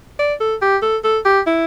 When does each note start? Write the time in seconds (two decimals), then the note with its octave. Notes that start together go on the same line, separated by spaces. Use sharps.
0.19 D5
0.40 A4
0.62 G4
0.82 A4
1.04 A4
1.25 G4
1.47 E4